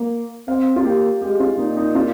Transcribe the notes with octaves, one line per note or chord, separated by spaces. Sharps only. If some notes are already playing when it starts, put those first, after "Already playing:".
Already playing: A#3
C4 F5
F4
A#3 G4
G#3 G4
F4
A#2 D#4
D#4
F4